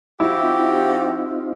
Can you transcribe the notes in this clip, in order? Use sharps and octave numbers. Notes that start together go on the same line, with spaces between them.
F3 E4 F#4 G4
C4 D#4 F4